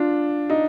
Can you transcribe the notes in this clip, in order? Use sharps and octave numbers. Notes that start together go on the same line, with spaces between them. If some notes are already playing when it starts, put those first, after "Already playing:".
Already playing: D4 F4
D#4